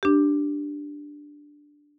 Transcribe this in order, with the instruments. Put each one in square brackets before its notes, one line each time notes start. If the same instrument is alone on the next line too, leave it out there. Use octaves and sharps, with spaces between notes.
[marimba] D4 G4